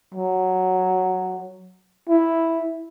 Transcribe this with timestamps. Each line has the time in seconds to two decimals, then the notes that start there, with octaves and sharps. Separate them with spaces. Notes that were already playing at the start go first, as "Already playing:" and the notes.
0.14 F#3
2.09 E4